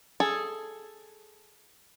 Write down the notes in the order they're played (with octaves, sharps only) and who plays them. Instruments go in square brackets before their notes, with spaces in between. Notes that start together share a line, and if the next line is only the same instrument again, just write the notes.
[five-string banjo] G#4 A4